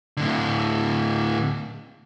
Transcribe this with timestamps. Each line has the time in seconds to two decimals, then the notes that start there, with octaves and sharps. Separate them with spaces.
0.17 A2 D3